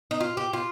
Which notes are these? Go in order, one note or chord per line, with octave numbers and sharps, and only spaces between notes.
D#4
F4
G4
F4